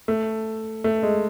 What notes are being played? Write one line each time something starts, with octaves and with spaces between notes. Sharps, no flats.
A3
A3
G#3